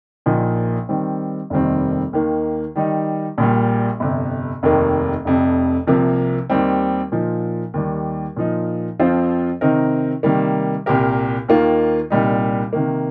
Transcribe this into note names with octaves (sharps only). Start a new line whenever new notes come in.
A#1 A#2 F3 D#4
D#3 G3 C4
F1 D#2 D#3 G3 C4
D#2 D#3 A#3
D#3 G3 D#4
A#1 A#2 G3
G1 F2 C3
F1 D#2 D#3 A#3
F1 F2 C3
C2 C3 F3 A#3
D#2 D#3 G3 C4
A#2 F3 D#4
D#2 D#3 G3
A#2 F3 D#4
F2 F3 C4 F4 C5
C3 D#3 C4 D#4 A#4
C3 D#3 G3 A#3
C2 A#2 A#3 G4 A#4
D#2 D#3 A#3 F4
C2 A#2 G3 D#4
C3 D#3 A#3